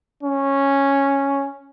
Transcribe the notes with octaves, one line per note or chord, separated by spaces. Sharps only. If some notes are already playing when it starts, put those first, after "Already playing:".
C#4